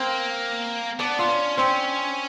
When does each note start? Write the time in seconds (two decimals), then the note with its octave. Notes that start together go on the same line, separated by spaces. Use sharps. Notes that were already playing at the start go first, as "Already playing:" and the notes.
Already playing: A#3 C4 C5
0.99 B3 D4 D5
1.19 F4 F5
1.29 C#4
1.57 C4 C#4 C5